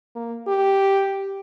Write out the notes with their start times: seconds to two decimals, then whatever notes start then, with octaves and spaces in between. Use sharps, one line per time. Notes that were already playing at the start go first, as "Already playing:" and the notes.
0.16 A#3
0.48 G4